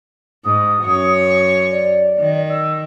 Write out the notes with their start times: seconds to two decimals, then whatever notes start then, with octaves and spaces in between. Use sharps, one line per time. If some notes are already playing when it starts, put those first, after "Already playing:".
0.44 G#2 D#6
0.83 F#2 C#5
1.71 D5
2.19 D#3
2.49 E6